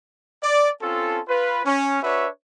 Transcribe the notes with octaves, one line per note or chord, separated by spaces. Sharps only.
D5
C4 C#4 F4 A4
F4 B4
C#4
D4 F#4 B4 C#5 E5